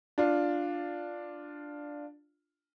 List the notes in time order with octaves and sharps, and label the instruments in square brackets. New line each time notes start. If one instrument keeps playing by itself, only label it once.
[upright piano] D4 F4